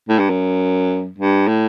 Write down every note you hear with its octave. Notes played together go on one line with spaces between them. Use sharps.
A2
G2
F#2
G2
A2